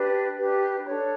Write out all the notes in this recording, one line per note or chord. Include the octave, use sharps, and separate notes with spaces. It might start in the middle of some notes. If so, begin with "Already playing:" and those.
Already playing: D4 G4 B4
D4 G4 B4
D4 A4 C#5 B5